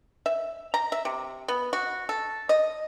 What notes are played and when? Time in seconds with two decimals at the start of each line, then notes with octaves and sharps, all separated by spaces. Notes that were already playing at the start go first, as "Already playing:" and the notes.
0.26 E5
0.74 A#5
0.92 E5
1.05 C3
1.48 B3
1.73 F#4
2.09 A4
2.49 D#5